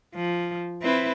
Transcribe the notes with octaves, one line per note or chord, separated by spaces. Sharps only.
F3
C4 E4 B4